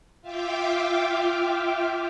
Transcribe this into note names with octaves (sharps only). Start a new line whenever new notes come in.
F4 E5 F5 G5 D6